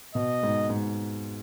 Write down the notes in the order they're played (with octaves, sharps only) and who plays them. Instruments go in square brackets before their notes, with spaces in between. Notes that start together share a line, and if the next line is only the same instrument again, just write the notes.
[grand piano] B2 [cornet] D#5
[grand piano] G#2
G#2